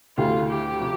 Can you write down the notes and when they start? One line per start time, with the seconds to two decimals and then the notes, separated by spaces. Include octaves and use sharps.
0.17 D2 D3 A3 E4 F4 G4
0.48 G4
0.80 C3 F3